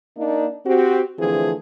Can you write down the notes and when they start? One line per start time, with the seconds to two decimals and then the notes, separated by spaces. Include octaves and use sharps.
0.17 A#3 D4 D#4
0.66 C4 F#4 G4
1.19 D3 E3 F3 A3 C4 G#4